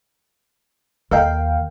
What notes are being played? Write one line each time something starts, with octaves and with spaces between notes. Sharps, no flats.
D#2 A4 A#4 D#5 F5 G5